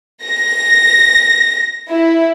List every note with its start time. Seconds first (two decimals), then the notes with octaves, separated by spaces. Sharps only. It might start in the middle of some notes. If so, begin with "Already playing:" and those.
0.24 A#6
1.89 E4